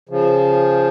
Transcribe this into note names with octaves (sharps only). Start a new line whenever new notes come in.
C#3 F3